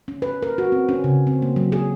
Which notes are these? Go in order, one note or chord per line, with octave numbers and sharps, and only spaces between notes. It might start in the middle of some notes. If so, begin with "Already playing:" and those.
C#4
B4
A#4
F#4
C4
C#4
C#3
C4
A#3
F#3
G#4